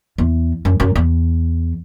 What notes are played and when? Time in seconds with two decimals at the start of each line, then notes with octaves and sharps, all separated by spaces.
0.18 E2
0.65 F#2
0.80 F#2
0.96 E2